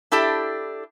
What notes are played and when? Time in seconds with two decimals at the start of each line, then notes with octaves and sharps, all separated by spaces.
0.12 D4 E4 G4 A4